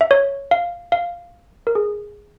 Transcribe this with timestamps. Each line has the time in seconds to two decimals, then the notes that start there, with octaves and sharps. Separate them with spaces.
0.01 E5
0.11 C#5
0.51 F5
0.92 F5
1.67 A#4
1.75 G#4